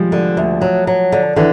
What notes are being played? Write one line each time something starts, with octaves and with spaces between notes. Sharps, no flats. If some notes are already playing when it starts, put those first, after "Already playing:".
Already playing: F3 G3 G#3
D3
D2
F#3
F#3
D3
D3 E3